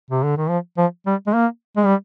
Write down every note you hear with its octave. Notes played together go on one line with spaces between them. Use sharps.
C3
D3
D#3
F3
F3
G3
G#3
A#3
G#3
G3